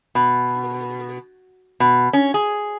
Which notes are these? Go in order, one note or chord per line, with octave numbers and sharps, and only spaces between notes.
B2
B2
C#4
G#4